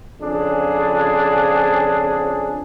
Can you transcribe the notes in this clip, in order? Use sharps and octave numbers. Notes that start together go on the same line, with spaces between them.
F2 C#3 D4 G#4